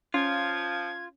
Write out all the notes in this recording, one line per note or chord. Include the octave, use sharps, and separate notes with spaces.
F3 C#4 F4 G#6